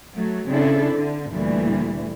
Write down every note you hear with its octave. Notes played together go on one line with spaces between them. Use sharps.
F#3 A3
C#3 C4 D4 E4 A4
D3
D2 A#2 E3 G3